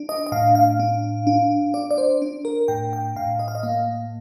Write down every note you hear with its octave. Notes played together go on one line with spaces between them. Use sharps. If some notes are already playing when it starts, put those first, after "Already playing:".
Already playing: D4
D#5
D#5
A2 F5
F5
D4
D4
D4 D5
D5
C5
D4
A#4
A2 G5
G5
A2 F5
D#5
F5
D#5
A#3 F5